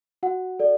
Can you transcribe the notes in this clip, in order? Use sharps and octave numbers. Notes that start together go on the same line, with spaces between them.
F#4 F#5
A4 D5